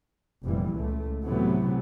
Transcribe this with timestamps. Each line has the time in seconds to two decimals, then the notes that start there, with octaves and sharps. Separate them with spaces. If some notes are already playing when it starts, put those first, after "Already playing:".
0.45 F1 A#2 E3 G3
0.76 C#2 A3
1.23 A2 C3 E3 F#3 A3 B3